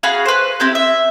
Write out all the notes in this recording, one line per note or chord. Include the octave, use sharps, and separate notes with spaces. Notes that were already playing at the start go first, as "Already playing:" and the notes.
F#4 G#4 F5 B5
B4 C5
C4 E4 G4
E5